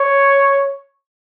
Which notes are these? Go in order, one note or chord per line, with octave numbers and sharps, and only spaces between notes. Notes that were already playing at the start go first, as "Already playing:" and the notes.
Already playing: C#5